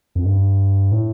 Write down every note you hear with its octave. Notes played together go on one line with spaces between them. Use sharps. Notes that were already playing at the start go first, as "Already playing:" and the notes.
F2
G2
A2